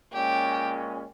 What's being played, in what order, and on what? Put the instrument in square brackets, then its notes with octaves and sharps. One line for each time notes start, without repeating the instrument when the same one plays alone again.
[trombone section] A#2 G#3 C#4 [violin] G4